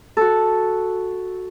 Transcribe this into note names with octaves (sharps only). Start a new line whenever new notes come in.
F#4 A4